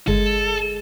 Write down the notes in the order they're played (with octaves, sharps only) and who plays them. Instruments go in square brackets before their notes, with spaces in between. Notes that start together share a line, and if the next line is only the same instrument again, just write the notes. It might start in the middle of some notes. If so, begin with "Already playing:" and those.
[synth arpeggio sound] G1 [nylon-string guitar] G#3 [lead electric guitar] A4